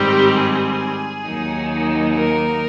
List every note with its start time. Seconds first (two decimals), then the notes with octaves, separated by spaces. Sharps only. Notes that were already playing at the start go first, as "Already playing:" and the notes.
Already playing: G#2 D#3 G3 C4 G4
0.37 G#4
1.26 D#2 D#3 F#3 A#3 D#4
2.16 A#4